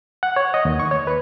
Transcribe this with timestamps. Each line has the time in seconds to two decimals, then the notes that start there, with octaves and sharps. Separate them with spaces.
0.23 F#5
0.36 C#5
0.54 D#5
0.65 D#2
0.80 C#6
0.91 C#5
1.07 B4